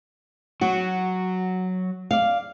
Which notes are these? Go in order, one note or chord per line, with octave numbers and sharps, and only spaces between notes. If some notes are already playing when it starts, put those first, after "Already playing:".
F#3 F#4
D5 F5